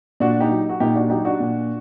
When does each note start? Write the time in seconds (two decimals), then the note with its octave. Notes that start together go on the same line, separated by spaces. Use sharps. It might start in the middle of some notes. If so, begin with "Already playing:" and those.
0.20 A#2 D4 F#4
0.41 D#4 G4
0.51 F#3
0.69 F#4
0.80 A#2 D#4 G4
0.95 D4 F#4
1.10 F#3 D#4 G4
1.25 D4 F#4
1.40 A#2